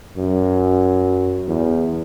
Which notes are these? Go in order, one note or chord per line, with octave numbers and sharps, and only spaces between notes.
F#2
E2